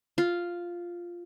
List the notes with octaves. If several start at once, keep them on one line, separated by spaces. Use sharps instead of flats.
F4